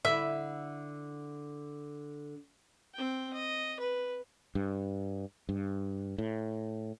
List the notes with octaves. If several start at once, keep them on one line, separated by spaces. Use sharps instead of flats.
D3 E4 E5
C4 G5
D#5
B4
G2
G2
A2